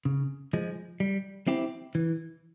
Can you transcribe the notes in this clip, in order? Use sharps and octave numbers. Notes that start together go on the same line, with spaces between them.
C#3
F3 G#3
G3
C4 E4 G4
E3